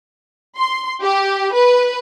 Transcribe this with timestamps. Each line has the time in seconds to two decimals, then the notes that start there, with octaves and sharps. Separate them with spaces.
0.57 C6
1.02 G4
1.54 B4